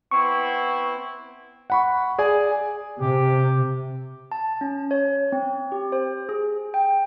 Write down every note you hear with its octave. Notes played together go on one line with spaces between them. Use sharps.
B3 C4 E4 C#6
F#5 B5 C#6
G#4 D5 G#5
C3 G4
A5
C#4
C#5
C4
G4
C5
G#4
G5